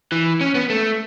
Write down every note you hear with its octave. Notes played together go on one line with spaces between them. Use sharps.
E3
C#4
B3
A3